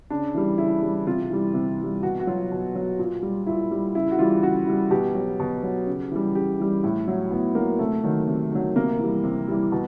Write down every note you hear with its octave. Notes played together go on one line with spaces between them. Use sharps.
C#3 D4
E3 G3
C#3 E4
E3 G3
C3 F4
E3 G3
C3
E3
G3
B2 F#4
F#4
F#3 F4
B2
F#3
A#2
G3
A#2 E4
G3
C#3 E4
F#4
E3 G3 F4
C#3 F#4
E3 G3
B2 G4
F#3
B2
F#3
C#3
E3 G3
C#3 G4
E3 G3
A2
F#3 E4
A2 B3
F#3 A#3
C3 A3
D#3 F#3
C3
D#3 F#3
C3 A#3
E3 G3
C3
E3 G3
B2